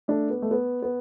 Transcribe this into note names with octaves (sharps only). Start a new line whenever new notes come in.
A3 D4
B3
A3
B3
B3